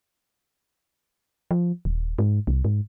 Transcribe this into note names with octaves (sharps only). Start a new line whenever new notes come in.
F3
D#1
G#2
C2
G#2